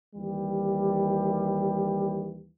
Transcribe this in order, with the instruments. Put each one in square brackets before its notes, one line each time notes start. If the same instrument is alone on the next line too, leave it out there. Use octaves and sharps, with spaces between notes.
[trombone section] D#2 E3 G3